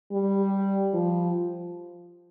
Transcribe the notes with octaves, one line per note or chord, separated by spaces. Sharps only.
G3
F3